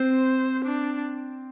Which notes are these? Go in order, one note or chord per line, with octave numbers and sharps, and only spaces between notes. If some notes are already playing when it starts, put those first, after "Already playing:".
Already playing: C4 C5
D4